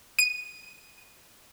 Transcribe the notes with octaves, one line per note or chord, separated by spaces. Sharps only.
D#7